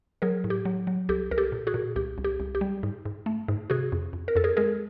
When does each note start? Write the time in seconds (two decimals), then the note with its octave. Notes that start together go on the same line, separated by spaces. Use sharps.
0.22 F#3 G#4 A#4
0.44 A2
0.50 G4
0.65 F#3
0.87 F#3
1.09 C2 G4 A4
1.31 C2 A#4
1.38 G4 A4
1.52 A#2
1.67 F#4 G#4
1.74 A#2
1.96 C2 G4
2.18 C2
2.24 G4
2.40 C2
2.55 G4
2.61 G3
2.83 G#2
3.05 G#2
3.26 A3
3.48 G#2
3.70 C3 F#4 G#4
3.92 F2
4.13 F2
4.28 A#4
4.36 F2 A4
4.44 G#4 A#4
4.57 G#3 G#4 A#4